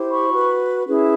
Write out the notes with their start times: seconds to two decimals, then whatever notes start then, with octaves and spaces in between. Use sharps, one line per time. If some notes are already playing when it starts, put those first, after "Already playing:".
Already playing: E4 G4 C5
0.10 B5 C#6
0.29 F#4 B4
0.87 C#4 E4 G#4 B4